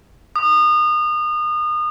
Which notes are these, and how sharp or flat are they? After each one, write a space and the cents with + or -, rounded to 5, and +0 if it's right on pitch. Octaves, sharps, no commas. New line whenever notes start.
D#6 -30